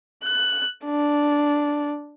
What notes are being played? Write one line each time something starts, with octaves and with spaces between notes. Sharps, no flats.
F#6
D4